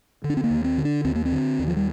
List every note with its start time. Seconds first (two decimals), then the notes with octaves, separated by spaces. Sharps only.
0.24 D3
0.30 D4
0.37 C4
0.44 A#3
0.50 D#2
0.64 C4
0.78 D3
0.85 D4
1.05 D#2 C4
1.15 A#3
1.25 C4
1.32 D3
1.59 D#2
1.67 F3
1.77 G3